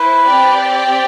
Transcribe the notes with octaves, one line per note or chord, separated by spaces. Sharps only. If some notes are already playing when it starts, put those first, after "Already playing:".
Already playing: E4 B4 C5
C4 G4 D5 G5